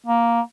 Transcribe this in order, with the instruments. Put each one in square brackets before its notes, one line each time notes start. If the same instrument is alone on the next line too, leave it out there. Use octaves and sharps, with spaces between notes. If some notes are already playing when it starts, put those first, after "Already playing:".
[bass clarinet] A#3